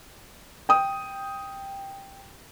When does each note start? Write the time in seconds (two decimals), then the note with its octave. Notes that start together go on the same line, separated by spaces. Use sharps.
0.69 G5 D#6